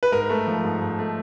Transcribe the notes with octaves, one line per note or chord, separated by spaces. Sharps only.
B4
G#2 A#4
A3
F3
G#2
G#2
A3